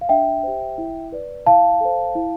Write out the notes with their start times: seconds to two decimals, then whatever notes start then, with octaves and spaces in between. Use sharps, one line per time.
0.01 F5
0.09 D4 E5 G5
0.43 G4 C5
0.78 E4
1.12 B4 D5
1.46 E4 F5 A5
1.81 A4 C5
2.15 E4